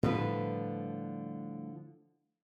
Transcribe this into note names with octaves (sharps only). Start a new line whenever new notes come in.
A2 D3 F3 G3 B4